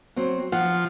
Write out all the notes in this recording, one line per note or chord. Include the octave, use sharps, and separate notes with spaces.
F#3 C4
F3 F#5